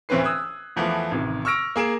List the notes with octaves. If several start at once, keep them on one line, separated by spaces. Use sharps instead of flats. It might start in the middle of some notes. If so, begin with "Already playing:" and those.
D1 E3 C4 C#4 B4 C7
D#6 E6 F#6 G#6
E2 E3 F3 A3 B3
A1 C3 D#3
C#6 E6 F6 A#6 D7
A#3 G#4 D7 E7